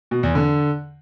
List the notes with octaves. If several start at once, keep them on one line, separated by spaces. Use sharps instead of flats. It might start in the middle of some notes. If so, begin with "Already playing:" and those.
B2
E2
D3